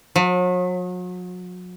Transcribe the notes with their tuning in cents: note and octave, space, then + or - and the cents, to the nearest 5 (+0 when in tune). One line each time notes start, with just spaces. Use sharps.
F#3 -40